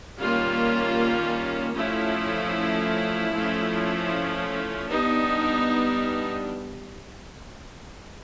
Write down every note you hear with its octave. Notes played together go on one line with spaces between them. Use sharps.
D#3 G3 A#3 C#4 F4
F3 A3 C#4 E4
F3 A3 C#4
G3 B3 D4 D#4